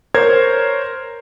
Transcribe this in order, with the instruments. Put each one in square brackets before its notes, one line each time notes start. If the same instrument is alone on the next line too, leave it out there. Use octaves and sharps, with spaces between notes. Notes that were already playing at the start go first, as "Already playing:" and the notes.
[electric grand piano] A#4 C5 C#5 G#6